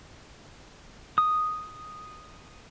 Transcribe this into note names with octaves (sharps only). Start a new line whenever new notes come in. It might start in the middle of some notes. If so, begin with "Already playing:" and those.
D#6